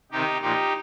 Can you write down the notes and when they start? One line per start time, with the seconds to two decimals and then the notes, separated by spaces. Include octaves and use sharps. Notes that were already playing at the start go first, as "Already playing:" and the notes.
0.12 C3 D#3 D#4 G4
0.41 A#2 F3 D#4 G4